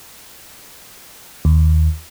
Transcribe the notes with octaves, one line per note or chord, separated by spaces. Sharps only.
D#2